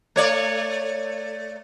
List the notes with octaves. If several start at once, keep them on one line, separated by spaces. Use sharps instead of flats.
A3 C#5 D5